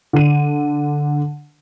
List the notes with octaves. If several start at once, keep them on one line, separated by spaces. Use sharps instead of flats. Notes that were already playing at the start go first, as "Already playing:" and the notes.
D3 D#7